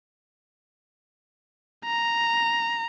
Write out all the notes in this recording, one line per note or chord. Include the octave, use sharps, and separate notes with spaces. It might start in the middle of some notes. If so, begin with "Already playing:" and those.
A#5